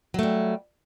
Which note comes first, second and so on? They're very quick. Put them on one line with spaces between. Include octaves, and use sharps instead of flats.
F#3 A3 G3